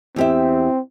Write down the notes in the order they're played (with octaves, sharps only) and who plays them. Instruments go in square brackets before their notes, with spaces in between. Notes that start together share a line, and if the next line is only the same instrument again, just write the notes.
[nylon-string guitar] E2 G4 E5 [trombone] C4